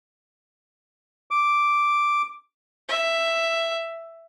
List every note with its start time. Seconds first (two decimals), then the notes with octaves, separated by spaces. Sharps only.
1.31 D6
2.89 E5